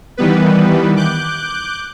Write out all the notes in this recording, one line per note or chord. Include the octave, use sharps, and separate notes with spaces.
D#3 E3 G3 B3 B4
D6 F#6 G6